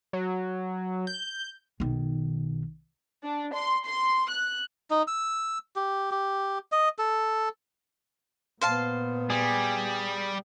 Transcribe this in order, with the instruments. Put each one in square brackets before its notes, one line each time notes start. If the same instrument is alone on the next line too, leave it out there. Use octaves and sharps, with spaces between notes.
[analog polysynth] F#3
G6
[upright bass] B1 D#3
[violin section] D4
C6
C6
F#6
[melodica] D#4
E6
G4
G4
D#5
A4
[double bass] A#2 B3 [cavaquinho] C5 F5 A5
[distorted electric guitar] G3 [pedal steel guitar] G#4